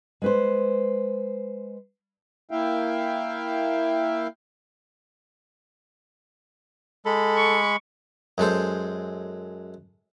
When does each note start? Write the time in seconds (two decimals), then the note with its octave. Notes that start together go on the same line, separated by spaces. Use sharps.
0.22 G#3 B4 C5
2.51 A#3 E4 E5 F5 G5
7.06 G#3 A4 B5
7.37 C#6
8.38 F#2 G#3 A4 C5